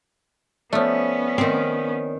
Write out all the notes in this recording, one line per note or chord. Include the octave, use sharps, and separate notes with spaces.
F3 A3 B3 C#4 C#5 D5
D#3 C4